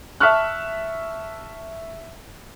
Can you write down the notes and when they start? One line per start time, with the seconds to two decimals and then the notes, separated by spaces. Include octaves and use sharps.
0.20 E5 A5 C#6 F6 F#6